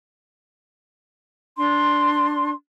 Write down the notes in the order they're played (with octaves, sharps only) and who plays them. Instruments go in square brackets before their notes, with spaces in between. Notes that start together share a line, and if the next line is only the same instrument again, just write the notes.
[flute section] D4 C6